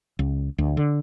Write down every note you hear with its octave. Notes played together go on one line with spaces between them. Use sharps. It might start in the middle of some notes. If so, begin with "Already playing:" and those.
C#2
D2
D3